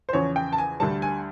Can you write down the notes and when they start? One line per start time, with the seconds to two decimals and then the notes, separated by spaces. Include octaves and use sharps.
0.09 C5
0.13 E2 C#3 F3 C#5
0.36 G5
0.53 A5
0.58 G#5
0.80 D2 D3 G3 A5
1.02 G#5